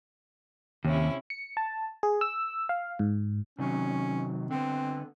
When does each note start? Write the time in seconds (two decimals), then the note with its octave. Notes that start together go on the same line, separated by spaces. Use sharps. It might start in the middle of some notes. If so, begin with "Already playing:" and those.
0.85 D#2 C3 C#4 E4
1.30 C#7
1.57 A5
2.03 G#4
2.21 E6
2.69 F5
2.99 G#2
3.59 C3 D#3 F#3 C#4
4.51 D3 B3 C4